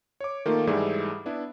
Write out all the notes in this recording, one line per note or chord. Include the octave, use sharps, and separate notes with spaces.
C#5 D6
D#3 A3 A#3 F4
G#2 E3 G3 A3 E4 G#4
B3 D4 E4